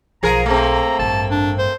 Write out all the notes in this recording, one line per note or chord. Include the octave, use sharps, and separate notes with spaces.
B1 F3 G#4 A#4 A#5
A3 A#3 C4
A1 G2 A5
D4
C5